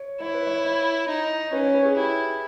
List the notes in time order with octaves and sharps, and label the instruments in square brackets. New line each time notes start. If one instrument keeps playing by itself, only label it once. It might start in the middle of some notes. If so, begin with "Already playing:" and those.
Already playing: [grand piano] C#5
[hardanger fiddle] E4 [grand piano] C#5
[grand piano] B4
C#5
C#5
[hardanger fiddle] D#4
[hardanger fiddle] C#4 [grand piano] B4
[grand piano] C#5
B4
G#4
[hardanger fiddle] E4 [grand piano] G4